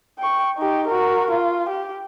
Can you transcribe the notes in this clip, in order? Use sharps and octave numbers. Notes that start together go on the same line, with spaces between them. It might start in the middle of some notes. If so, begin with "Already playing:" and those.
G5 C#6
D#4 G4
F#4 A#4
F4
G4